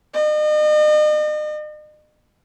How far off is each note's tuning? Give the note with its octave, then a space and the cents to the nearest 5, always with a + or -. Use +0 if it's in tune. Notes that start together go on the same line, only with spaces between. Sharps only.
D#5 -40